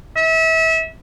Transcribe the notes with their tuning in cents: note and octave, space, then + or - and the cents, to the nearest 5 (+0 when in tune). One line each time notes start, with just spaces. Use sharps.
E5 -30